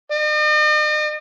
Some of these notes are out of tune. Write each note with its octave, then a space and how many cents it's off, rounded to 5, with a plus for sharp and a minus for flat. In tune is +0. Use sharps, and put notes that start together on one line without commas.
D#5 -45